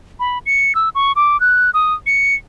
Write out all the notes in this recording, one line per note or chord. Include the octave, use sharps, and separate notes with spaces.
B5
C#7
E6
C#6
D6
F#6
D#6
C#7